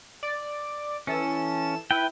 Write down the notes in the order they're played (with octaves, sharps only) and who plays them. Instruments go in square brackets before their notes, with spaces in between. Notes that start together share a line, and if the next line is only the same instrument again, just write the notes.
[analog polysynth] D5
[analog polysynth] E3 A4 E7 [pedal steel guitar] C#4
[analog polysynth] E4 [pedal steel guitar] B4 G5